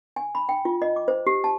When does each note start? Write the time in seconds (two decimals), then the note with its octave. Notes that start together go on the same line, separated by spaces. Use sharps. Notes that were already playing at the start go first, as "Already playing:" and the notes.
0.16 G#5
0.35 B5
0.49 G5
0.65 F4
0.82 D#5
0.96 D6
1.08 C5
1.27 G4
1.44 A5